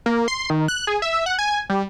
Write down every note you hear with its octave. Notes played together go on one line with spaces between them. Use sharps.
A#3
C6
D#3
F#6
G#4
E5
F#5
G#5
G3